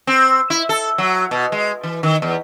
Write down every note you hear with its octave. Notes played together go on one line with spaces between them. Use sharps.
C4
E4
A4
F#3
B2
G#3
E3
D#3
E2